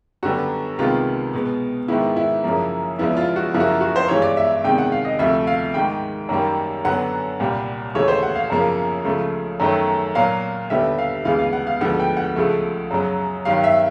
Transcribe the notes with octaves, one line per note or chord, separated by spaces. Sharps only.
F#2 D3 G3 B3 F#4
C2 C3 D#3 G#3 B3 F4
B2 G#3 B3
G#2 D#3 G#3 B3 E4
E4
F#2 C#3 F3 A#3
E2 C#3 F3 G#3 B3 E4
F4
F#4
F#2 C#3 F3 A#3 E4
F#4
F4
F#4
C5
G2 E3 G#3 C#5
D5
E5
E2 C3 D#3 G#3 G5
F#5
F5
D#5
D2 C3 F3 A3 E5
F5
G#2 D#3 G#3 G5
F#2 D#3 G3 A#3
F#2 D3 F#3 B3 F#5
C2 A#2 G3
D#2 C#3 E3 A3 C#5
C5
F#5
F5
F#2 C#3 F3 A#3
C#2 C#3 F3 A3
F#2 D#3 F#3 A3
A#2 F#3 A#3 F5
D#2 D3 G3 B3 E5
F5
D2 C#3 E3 G#3 B3 F5
F5
F#5
F5
D2 D3 F3 G#3 B3 F#5
G5
F#5
C#2 C#3 F3 A3
F#2 C#3 F#3
G2 D#3 F#3 F5
E5